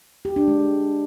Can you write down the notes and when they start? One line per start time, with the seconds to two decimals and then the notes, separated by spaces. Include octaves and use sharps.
0.25 G4
0.36 D4
0.48 G#3